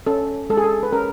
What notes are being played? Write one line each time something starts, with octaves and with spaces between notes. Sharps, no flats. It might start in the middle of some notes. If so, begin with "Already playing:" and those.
C#4 A4
G#3 A4
G#4
A4
B4
C#4 A#4